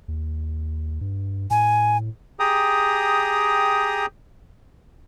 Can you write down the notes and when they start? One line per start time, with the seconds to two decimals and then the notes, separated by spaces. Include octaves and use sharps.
0.08 D#2
1.01 G2
1.51 A2 G#5
2.40 G4 G#4 G5 A#5 D#6